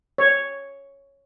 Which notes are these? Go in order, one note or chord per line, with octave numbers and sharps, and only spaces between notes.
C#5